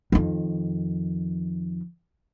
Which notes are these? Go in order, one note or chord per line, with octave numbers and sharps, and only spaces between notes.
F2 D#3